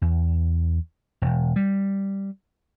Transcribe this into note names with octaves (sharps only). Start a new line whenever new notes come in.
E2
E1
G3